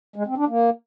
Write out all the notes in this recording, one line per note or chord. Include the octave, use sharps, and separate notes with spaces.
G#3
C4
D4
A#3